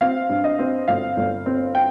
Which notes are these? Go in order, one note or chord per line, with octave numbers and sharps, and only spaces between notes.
C4 F5
G2
D#5
C4
G1 F5
G1
C4
G5